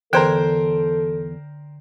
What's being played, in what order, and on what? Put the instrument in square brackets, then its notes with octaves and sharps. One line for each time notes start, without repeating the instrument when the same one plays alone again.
[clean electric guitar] E2 [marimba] D3 G#6 [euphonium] A4 [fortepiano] A#4 C5 G5